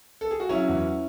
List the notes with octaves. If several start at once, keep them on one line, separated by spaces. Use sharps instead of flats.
A4
G#4
F#4
F#3 C#4 E4
E2